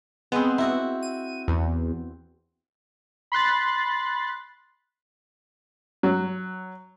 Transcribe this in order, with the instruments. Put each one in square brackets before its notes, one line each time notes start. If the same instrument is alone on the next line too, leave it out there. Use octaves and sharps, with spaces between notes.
[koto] G#3 C4 [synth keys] B3
[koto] E4 F#4
[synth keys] D#7
E2
B5 C6 F#6 A6
[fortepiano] F#3